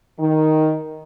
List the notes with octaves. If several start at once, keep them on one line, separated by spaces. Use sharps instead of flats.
D#3